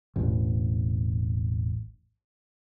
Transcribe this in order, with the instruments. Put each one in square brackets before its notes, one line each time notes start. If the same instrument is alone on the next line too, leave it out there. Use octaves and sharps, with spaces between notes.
[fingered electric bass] E1 A1